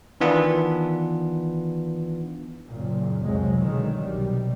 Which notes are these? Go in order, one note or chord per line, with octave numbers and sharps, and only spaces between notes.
D#3 E3 B3 D4 F4
F#1 A#2
C2 F2 C3 F#3 G#3
B2 D3 D#3 F#3 G#3
B1 C3 G3